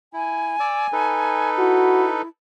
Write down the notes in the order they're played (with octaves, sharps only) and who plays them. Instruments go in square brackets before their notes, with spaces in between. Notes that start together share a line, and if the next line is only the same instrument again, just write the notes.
[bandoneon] E4 [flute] G#5
[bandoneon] D5 D6 E6
D#4 A4 B4
[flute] E4 [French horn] F#4